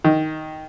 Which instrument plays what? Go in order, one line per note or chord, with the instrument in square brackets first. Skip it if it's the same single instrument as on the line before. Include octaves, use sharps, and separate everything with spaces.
[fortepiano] D#3